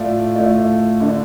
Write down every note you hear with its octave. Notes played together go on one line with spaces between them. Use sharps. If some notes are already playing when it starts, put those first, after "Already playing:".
Already playing: A2 A3 F4 D5
A2 A3 F4 D5
D3 A3 D4